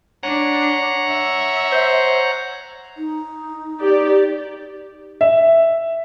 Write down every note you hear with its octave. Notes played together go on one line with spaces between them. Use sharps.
D4 C#5 F#5 A#5
E5
C5
D#4
G4 D5
E5